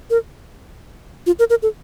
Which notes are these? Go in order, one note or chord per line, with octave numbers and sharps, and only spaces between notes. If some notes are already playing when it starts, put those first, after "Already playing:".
A#4
F4
A#4
A#4
A4